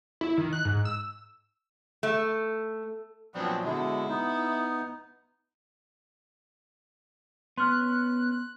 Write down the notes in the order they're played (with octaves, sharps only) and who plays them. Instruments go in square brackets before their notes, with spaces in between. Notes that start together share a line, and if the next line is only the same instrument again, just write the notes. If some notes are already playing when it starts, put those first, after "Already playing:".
[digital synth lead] E4
D#3
F#6
G#2
E6
[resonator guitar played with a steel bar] A3
[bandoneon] A#2 F3 F#3 [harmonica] B3 C4 D4
[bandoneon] B2 D3 G#3 [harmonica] E4
[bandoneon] B3 D#4
[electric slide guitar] B3 C#4 [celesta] C6 F6 [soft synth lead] F#6